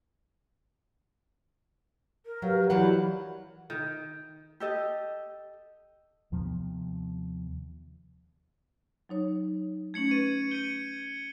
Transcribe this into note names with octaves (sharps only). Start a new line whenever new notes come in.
A#4
F#3 G4 B4 F5
E3 F#3 G4 D5 F#5 B5
D#3
G4 A4 D#5
D#2 C3 F3 B3
F#3 D#4 C#5
A3 C#4 G#6 C#7 F#7
B4 C#6 A6 D#7
G6 C#7 D#7 G7